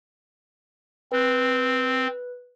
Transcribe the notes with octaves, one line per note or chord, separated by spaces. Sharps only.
C4 B4 F#6